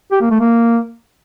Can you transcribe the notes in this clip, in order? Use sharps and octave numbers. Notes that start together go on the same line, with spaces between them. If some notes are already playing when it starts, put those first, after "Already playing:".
G4
A#3
A3
A#3